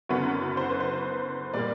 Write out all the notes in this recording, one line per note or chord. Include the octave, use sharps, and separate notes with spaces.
F#1 F#2 D3 F#3 B3 C#5
C5
B4
C5
A#2 G3 A#3 D5